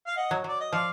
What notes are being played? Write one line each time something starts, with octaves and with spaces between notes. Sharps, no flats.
F5
D#5 F#5
F#3
F#3 D5
D#5
F3 D5 F5